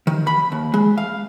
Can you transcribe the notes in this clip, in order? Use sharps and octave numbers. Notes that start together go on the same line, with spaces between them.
D#3
B5
D#2
G#3
F5